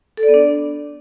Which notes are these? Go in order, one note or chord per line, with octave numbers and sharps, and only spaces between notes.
A4
D5
B3
D4